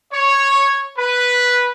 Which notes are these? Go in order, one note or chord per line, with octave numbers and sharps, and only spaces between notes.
C#5
B4